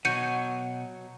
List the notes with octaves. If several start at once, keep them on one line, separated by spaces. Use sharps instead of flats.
B2 F#3 G6 C#7 D#7